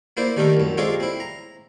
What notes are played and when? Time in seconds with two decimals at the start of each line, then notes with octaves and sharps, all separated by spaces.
0.17 A#3 E4 C5 D5
0.37 D#3 G3 A3 A4 A#4
0.57 C2 F#2
0.77 G#3 C4 F4 A4 C#5 D5
1.00 C4 E4
1.20 A#5